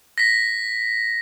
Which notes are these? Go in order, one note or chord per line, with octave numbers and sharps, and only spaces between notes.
A#6 B6